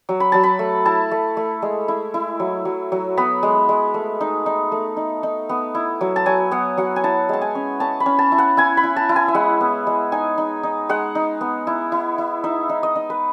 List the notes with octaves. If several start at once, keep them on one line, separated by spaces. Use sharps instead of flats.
F#3
B5
F#3 A5
B5
A3
E4 A5
A3
A3
G#3
E4
E4
F#3
F#3
F#3
B3 B5
G#3
G#3
A3
D#4
D#4
A3
D#4
D#4
B3
E4
F#3
A5
F#3 G#5
B3 F#5
F#3 F#5
G#5
E4 A5
G#3 A5
G#5
C#4
C#4 A5
B5
C#4
A5
E4
F#5
E4 G#5
B5
E4
A5
E4
G#5
E5
G#3 F#5
B3
G#3
D#4 G#5
D#4
D#4
G#3 F#5
D#4
B3
E4
E4
E4
D#4 E5
D#4
D#5
D#4
B4